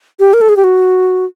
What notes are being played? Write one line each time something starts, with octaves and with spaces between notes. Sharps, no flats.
G4
A#4
A4
G#4
G4
F#4